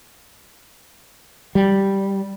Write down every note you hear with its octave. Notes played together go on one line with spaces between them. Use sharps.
G3